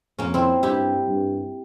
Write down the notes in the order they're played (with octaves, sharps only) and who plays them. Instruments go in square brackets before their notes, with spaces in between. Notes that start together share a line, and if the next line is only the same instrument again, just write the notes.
[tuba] F2 [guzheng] A#3 C#4
[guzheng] C4 E4
[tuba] G2 [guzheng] E4 G4
[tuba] G2